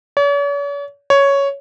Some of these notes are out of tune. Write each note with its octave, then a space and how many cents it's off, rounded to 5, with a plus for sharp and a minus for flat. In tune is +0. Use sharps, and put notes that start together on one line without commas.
C#5 +45
C#5 +5